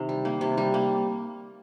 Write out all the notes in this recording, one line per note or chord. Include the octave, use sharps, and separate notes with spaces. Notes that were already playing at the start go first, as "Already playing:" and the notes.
Already playing: C3 D#3
G3
A#3
C3
G3
A#3